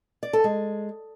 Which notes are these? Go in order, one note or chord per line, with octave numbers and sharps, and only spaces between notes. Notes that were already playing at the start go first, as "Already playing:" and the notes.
D5
A4
G#3